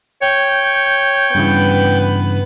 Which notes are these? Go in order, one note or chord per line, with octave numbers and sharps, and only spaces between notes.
C#5 G5 G6
G2 C#3 E3 B3 B4